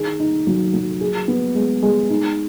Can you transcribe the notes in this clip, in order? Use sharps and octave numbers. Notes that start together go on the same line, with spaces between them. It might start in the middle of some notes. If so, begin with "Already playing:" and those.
Already playing: D#3 G#4
D#4
F#3
F#3
G#4
B3
G#3
G#3
D#4